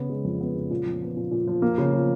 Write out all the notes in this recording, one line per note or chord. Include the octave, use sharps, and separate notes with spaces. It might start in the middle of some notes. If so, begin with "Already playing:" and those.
Already playing: C#3 B3
G#3
F2
B3
C#3
A#2
F3
B3
A#2
A#2
F3
A#3
C#3
F3